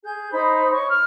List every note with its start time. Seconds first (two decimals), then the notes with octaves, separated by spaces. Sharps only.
0.04 G#4 G6
0.32 D#4 C5 B5
0.71 C#5 C#6
0.89 F6